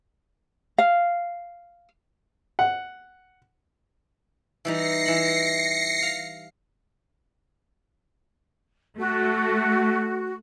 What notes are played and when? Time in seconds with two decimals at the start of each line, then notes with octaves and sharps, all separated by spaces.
0.78 F5
2.59 F#5
4.65 E3 G3 D#4 A#6 C7 C#7
5.06 E3 B5
6.02 F5
8.98 A3 F#4